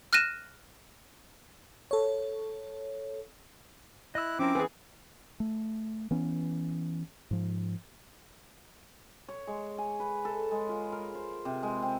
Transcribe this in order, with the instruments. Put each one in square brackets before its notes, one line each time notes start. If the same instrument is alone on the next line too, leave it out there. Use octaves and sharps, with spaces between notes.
[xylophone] F6 F#6 A#6 D#7 E7
[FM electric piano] A4 C#5
[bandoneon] E4 F#6 [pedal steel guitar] D#5 E6
[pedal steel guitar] F3 E4 A#4 [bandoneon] C4 D6 [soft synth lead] C#4
[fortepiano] E3 G#4 [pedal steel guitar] B3
[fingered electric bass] A3
E3 B3 C#4
G#2 F3
[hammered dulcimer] C#5
G#3
G#5
B4
A4
G#3
F4
A#4
C5
C3
G#3
C4